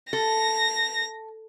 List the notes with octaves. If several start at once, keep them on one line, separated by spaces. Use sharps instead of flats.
A4 A#6